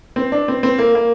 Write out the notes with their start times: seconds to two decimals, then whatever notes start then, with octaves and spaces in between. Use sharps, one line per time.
0.16 C4
0.32 D4
0.48 C4
0.63 C4
0.78 A#3
0.95 A#3